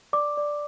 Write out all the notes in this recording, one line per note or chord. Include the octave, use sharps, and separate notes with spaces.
D5 D6
D5